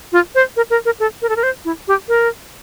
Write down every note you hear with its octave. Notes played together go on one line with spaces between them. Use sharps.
F4
C5
A#4
A#4
A#4
A4
A#4
A4
A#4
C5
E4
G4
A#4